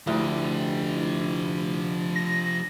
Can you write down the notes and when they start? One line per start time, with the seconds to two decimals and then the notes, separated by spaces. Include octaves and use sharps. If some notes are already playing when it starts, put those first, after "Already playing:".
0.07 D2 F3 E4 G4
2.16 A#6